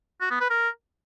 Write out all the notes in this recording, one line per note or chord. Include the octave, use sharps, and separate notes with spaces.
F#4
B3
B4
A#4